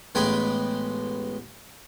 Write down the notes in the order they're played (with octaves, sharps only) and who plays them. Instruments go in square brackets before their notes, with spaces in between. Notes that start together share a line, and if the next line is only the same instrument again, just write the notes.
[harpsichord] A1 G#3 B3 B4 G5 G#5